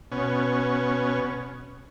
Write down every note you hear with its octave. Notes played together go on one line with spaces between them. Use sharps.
B2 C#4